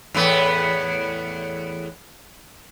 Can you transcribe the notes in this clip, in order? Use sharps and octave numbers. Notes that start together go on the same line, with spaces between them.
E2 A2 B3